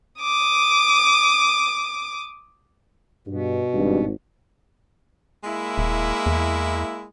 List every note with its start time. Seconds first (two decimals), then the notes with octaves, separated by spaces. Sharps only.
0.22 D6 D#6
3.27 G2 B2
3.74 G#1 G2
5.44 G#3 A#3 E4
5.78 D#1
6.26 E2